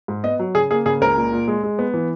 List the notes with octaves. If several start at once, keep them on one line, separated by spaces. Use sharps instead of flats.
G#2
B3 D#5
F#3
C#3 G#4
A#3 G#4
C#3 G#4
C#2 A#4
A#2
A#2
G#3
G#3
B3
E3